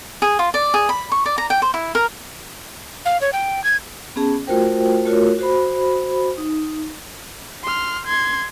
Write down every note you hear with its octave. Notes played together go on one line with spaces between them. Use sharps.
G#4
F4
D5
G#4
B5
C#6
D5
A#5
G5
C5
E4
A#4
F5
C#5
G5
G#6
B3 C#4 G#4 A5
A3 F4 F#4 A#4 C5 G5
A3 F4 F#4 A#4 C#5
F#4 C5 B5
D#4
C6 F6
C6 G#6